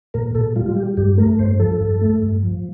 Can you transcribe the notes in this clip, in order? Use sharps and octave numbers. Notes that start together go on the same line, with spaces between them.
A#2 A#4
A#2 A4
G3 F4
F4
G3 G4
G2 G4
A3 A#4
G2 C5
F3 A4
G2
A3
G2
F3